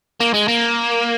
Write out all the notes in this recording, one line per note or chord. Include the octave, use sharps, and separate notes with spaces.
A#3
G#3
A#3